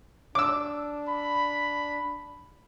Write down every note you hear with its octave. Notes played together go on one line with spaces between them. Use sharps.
D4 D6 E6
B5